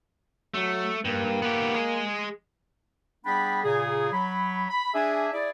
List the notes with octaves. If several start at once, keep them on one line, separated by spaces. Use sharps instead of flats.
F#3 A3
G2 A#3
B3 G4
G#3 G#4
G3 B3 D4 G#4 G5 B5
A#2 C#3 G#4
F#3 B5
B5
D4 G#4 E5 G#5
E4 G#4 D5